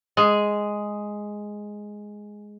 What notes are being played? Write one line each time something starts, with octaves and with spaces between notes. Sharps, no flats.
G#3 G#4